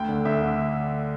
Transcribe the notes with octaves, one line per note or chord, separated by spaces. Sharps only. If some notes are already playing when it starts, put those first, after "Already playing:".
Already playing: D2 G5
D3
D2 E5
D3